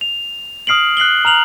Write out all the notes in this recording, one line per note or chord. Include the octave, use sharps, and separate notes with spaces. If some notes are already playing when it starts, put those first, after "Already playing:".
F7
D#6 F6 C7 D7 F#7
F#6 C7 F#7 G7
A#5 F6 F7 F#7